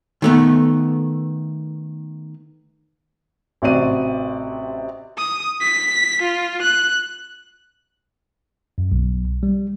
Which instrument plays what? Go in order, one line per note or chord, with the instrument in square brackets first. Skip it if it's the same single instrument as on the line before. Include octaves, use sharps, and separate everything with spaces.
[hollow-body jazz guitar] D#3 A3 B3
[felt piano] A1 C3 F#4 D5 D#7
[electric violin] D#6
B6
F4
F#6
[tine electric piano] F#2
B1
G3